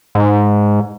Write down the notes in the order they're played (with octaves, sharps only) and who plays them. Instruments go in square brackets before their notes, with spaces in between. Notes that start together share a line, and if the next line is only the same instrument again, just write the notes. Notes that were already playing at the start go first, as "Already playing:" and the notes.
[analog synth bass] G#2